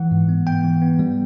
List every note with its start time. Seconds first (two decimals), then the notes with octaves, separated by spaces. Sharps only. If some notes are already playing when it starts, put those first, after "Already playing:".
Already playing: E3 F#5
0.11 G#2
0.29 B3
0.47 B3 G5
0.64 E3
0.82 B3
0.99 G3